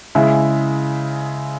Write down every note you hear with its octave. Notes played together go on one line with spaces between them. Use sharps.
C#3 G#3 E4